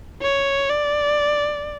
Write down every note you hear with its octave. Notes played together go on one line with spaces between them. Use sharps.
C#5
D5